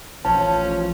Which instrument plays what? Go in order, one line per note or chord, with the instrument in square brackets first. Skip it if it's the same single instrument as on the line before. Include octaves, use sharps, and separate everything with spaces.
[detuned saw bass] A1 [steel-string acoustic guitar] F3 [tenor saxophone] C#4 [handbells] A5